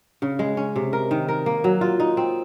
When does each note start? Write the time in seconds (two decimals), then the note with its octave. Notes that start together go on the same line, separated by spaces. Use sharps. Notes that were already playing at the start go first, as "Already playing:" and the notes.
0.22 C#3
0.39 G#3
0.57 C#4
0.76 C3
0.93 A#4
1.11 D#3
1.28 A#4
1.46 A#3
1.64 F#3
1.81 F4
2.00 D#4
2.17 C4